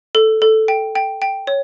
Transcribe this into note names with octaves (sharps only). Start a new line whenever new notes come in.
A4
A4
G5
G5
G5
C#5